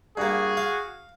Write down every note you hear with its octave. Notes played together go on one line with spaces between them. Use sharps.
G2 A#3 F#4 G#4
F5